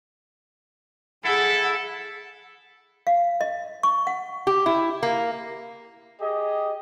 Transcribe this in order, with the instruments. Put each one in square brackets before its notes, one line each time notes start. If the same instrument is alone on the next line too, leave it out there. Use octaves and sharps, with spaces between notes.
[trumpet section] E4 A4 [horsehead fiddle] G#4 F#5
[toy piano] F5
D#5
C#6
F#5
[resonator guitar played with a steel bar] G4
E4
A#3
[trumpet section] G4 G#4 D#5